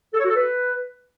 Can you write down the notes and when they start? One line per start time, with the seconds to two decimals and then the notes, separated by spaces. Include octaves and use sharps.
0.14 A4
0.19 C#5
0.25 F#4
0.30 A4
0.36 B4